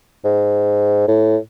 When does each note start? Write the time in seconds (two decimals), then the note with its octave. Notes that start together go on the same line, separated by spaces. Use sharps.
0.25 G#2
1.08 A2